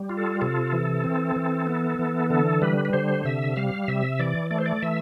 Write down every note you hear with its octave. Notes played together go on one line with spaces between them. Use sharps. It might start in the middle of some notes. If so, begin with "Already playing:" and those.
Already playing: G3
F4
A4
C3 A4
E3
C4
E3
B3
E3
D3 A4
G3 B4
B4
D3 C5
C3 E5
G3 F5
C3 E5
E3 D5
A3 D5
C5
D5
E3 E5